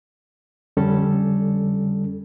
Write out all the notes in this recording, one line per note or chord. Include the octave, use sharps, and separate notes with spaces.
F2 D3 G3 C#4 A4